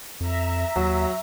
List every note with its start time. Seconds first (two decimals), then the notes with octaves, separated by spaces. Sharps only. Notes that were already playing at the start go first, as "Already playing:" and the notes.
0.20 F2 E5 A#5
0.76 D#2 F#3